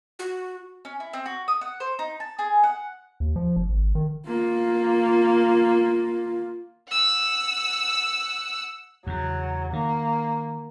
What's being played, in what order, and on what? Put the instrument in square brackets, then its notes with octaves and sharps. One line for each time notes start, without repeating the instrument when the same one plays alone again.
[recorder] F#4
[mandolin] C#4
E4
C4
F#4
D#6
F#5
C5
D#4
A5
G#4
F#5
[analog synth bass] D#2
F3
F1
G#1
D#3
[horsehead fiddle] A#3 F4
[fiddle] F#5 E6
[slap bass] E2 C#3 [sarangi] F#3
[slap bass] D#3 [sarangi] A#3